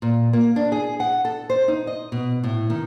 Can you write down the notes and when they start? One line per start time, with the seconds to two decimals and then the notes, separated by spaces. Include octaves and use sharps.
0.02 A#2
0.33 A#3
0.56 D4
0.72 G#4
1.00 F#5
1.25 A4
1.50 C5
1.68 D#4
1.87 D#5
2.12 B2
2.43 A2
2.70 D#3